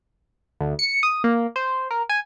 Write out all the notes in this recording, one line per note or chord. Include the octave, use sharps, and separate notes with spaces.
D2
C#7
D#6
A#3
C5
A#4
G#5